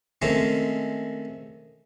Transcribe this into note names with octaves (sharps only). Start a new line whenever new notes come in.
D#3 G#3 A3 C4 C#4